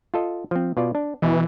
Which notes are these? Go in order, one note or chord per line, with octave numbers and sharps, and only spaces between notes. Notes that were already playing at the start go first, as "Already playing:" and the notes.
F4 A4 D#5
F3 C4
B2 F4 D5
D4
B2 E3 D#5